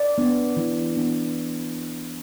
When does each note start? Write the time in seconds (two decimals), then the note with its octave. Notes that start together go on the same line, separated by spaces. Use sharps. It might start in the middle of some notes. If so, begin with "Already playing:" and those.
Already playing: D5
0.18 B3 D4
0.57 E3
0.97 B3 D4